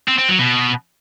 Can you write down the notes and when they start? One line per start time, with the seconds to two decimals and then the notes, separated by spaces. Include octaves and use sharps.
0.08 C4
0.18 C4
0.29 F#3
0.39 B2